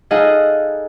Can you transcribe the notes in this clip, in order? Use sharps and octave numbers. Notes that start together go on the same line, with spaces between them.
D#4 G#4 A4 D#5 F5 F#5